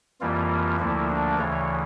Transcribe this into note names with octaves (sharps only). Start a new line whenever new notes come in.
F2 E3 G3 A#3 F4
D2 D3 F3 A#3 E4
D4
D2 C#3 E3 C#5